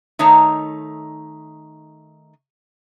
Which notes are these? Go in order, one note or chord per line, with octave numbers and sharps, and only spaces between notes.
D#3 A3 D#4 C#5 A5 A#5